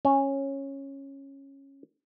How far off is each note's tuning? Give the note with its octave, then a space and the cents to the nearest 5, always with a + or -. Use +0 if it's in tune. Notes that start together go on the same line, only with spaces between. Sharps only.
C#4 -15